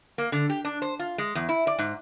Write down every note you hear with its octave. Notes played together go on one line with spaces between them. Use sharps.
A#3
D3
G4
D4
C5
F4
G#3
E2
E4
D5
G#2